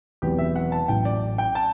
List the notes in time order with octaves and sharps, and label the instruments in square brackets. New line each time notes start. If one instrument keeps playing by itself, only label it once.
[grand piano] E1 E2 C3 F#3 B3 [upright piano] G4
[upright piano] E5
F#5
A5
[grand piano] A1 A2 F#3 [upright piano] G5
[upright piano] D5
G5
A5